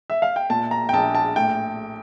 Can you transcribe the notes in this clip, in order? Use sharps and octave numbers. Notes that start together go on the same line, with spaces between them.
E5
F5
G5
A#2 A5
A#5
G5
A#1 A5
A5
A2 G5